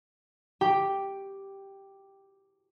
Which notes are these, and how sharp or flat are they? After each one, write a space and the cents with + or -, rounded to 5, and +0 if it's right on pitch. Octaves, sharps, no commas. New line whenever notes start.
G4 +0 G5 +0